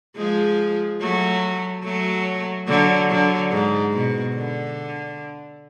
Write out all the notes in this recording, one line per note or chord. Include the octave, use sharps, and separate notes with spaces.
F3 G#3
F#3 A3
F#3 A3
D3 F#3
D3 F#3
G#2
B2
D3